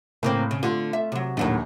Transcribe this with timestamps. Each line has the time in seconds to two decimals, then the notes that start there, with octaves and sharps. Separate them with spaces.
0.23 A2 C#3 A#3 C4
0.51 C#3
0.63 D3 A3 F4
0.93 E5
1.12 C3 F#3
1.37 A#1 D#2 A2 F#3 A3